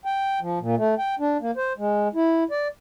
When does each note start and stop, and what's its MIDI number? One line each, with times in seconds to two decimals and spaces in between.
0.05 0.39 79
0.41 0.59 53
0.60 0.75 46
0.78 0.94 57
0.99 1.15 79
1.20 1.37 62
1.41 1.51 58
1.57 1.73 72
1.78 2.08 56
2.15 2.44 64
2.51 2.68 74